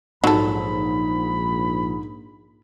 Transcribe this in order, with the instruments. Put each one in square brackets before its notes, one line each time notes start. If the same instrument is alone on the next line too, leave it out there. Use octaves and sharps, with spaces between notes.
[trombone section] A#1 [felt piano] G#2 [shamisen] F#3 A4 [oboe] B5